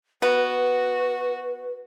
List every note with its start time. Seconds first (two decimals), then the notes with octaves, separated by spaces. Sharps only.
0.22 B3 F#4 B4